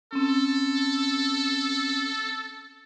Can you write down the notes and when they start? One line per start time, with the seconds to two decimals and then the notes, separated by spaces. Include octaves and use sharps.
0.13 C4 C#4 A4